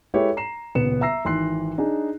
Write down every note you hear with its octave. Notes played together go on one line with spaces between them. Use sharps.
G#3 E4 G4 A4 B4 C#5
A#5 C7 E7
D#1 C#2 B3 B4 C#7 E7
E5 A#5 E6 A#6 C7
G#1 E3 C6 F#6 C7
D4 D#4 G#4